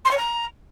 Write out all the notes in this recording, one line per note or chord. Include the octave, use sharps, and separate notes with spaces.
C6
C#5
A#5